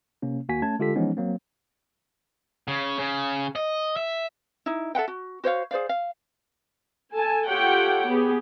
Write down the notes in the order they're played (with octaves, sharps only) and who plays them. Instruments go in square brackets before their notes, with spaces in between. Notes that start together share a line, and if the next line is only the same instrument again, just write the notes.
[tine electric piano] C3 A#3 C#4
D#2 A#3 F#4 G#5 B6
A3 C#4 A5 G#6
D3 G#3 F4 G4 A4 B6
E3 F3 G#3 B3 C#4 D#4
F#3 A#3 C4
[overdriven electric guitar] C#3
C#3
D#5
E5
[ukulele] D#4 E4
A4 E5 F#5 G5
F#4
F#4 C5 C#5 F5
G#4 C5 D5 F5
F5
[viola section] A4 G#5 A5
F4 G4 A4 C#5 F#5 G5
B3 G4 G#4